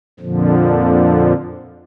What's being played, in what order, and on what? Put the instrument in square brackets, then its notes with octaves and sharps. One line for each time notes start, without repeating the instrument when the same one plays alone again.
[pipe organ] F2 A#2 D3 F3